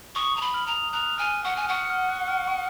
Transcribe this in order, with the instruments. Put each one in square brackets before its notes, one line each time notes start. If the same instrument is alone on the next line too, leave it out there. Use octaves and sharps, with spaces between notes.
[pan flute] C#6 [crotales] D#6
[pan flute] A#5
B5
[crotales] F6
[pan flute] A#5
[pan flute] A#5 [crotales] F#6
[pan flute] G#5 [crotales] F6
[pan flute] F#5 [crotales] C#6
[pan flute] G#5
[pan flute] F#5 [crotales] C#6
[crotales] F6
F#6
F6
C#6